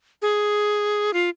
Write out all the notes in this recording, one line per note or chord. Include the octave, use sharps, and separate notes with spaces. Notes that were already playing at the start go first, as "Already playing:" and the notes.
G#4
F4